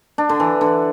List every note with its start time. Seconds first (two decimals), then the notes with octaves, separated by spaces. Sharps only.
0.18 D4
0.29 D3
0.40 E3
0.61 D3